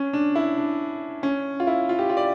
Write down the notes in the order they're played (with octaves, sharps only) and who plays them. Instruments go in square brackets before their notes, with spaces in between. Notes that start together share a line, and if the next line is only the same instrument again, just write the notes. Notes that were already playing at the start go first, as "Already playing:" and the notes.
Already playing: [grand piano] C#4
D4
E4
D4
C#4
F4
E4
F4
G4
F4
D5